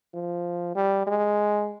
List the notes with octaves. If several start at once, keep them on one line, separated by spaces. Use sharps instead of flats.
F3
G3
G#3